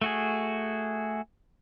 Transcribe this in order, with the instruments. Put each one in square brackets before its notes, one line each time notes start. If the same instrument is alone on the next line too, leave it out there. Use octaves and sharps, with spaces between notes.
[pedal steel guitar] A3 F#4 G#4